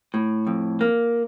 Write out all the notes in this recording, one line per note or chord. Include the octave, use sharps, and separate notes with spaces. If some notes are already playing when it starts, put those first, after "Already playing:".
A2
F2
A#3